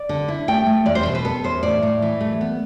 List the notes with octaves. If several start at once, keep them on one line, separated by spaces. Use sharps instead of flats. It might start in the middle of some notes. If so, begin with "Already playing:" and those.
Already playing: D5
D3
E4
A3 G5
A3
E2 D5
C5
B2 C5
B4
B3 A4
E2 C5
A2 D5
A2
E3
A3
B3